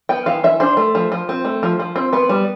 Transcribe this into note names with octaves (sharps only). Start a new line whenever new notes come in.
B3 G5
E3 F5
E3 E5
D4 C5
A3
F3
F3
C4
A3
F3
F3
C4
B3 B4
G3